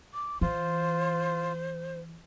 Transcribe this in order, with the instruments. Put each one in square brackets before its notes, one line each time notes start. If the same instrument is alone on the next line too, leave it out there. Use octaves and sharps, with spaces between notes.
[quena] D6
[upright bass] E3 [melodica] F4 [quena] C5